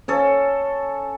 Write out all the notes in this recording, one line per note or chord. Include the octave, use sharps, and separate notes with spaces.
C#4 A4